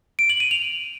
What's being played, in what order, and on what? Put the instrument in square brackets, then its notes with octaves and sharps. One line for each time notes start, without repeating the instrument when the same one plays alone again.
[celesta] D7
F#7
D#7
F7